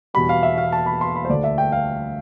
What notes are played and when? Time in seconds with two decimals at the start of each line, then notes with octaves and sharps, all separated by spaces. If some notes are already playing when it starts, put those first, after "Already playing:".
0.14 E2 B2 G3 B5
0.29 F5
0.43 E5
0.58 F5
0.72 A5
0.86 B5
1.01 C6
1.15 B5
1.25 C5
1.29 D2 D3 A3 D5
1.44 E5
1.58 G5
1.72 F5